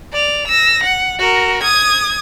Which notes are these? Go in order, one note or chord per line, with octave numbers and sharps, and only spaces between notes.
D5 F7
E6 A#6
F#5
F#4 A#4
D#6 G#6